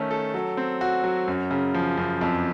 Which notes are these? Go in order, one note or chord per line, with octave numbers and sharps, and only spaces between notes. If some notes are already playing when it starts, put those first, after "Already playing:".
Already playing: D#3 A3 C#4
A4
F#3
C4
F#4
F#3
F#2
C#3
F3
F#2
F2